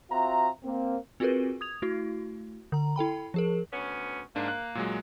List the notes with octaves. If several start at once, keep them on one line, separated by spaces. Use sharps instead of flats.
C4 F4 F#4 E5 A#5
A#3 C4
C4 F4 F#4 G#4 A#4 B4
D#6 G#6 F7
A3 E4 F#4
D3 A#5
E4 A4 G5 B5
F3 G#4 A#4
D2 B3 C#4
G#2 A#3 D4
F#6
A#2 F#3 G#3